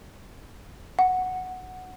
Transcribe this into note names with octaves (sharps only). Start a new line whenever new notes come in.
F#5